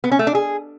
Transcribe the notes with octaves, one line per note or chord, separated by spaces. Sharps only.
B3
C#4
A3
D4
G#4